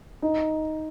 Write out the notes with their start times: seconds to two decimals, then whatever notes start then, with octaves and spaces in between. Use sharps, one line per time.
0.22 D#4